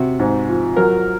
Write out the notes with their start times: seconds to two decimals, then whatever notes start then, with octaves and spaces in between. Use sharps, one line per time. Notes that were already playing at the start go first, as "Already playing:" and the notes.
Already playing: C3 F#4
0.19 G#2
0.48 F3
0.76 F#3 A#4